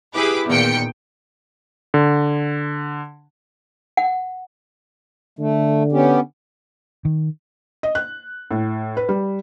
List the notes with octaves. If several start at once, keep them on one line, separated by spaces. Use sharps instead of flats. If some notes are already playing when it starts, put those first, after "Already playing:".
E4 G4 G#4 B4 D6
E2 A#2 D#3 G5 C#7
D3
F#5
D3 A3
B3 C#4 G4
D#3
D#5
F#6
A2
B4
G3